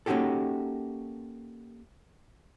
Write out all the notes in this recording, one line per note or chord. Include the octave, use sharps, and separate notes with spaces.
A#3 C#4 D#4 F#4 G4 A4